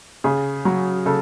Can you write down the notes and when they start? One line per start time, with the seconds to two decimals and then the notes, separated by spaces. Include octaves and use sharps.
0.24 C#3 G#4
0.65 F#3
1.06 C#3 A4